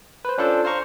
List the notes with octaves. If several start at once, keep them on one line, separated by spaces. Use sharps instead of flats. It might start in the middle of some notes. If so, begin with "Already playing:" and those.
B4 C5
C#4 D4 F4 A4 C5
C5 F5 A#5 C#6